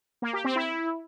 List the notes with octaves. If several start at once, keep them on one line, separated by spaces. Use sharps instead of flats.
A#3
G4
C4
E4